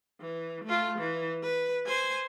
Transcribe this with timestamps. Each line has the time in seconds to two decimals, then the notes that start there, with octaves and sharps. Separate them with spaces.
0.20 E3
0.65 A3 F4
0.98 E3
1.43 B4
1.87 C5 G#5